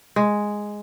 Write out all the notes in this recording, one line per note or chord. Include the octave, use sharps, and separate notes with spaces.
G#3